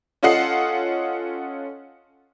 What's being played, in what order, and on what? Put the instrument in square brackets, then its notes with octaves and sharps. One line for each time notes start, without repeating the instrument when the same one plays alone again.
[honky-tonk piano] C#4 F4 A4 D#5 F#5 C7